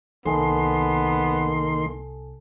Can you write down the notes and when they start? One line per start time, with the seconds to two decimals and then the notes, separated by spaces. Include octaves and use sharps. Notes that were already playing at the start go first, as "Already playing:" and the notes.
0.26 C2 D#3 A#3 B3 A4 G#5 A5 C6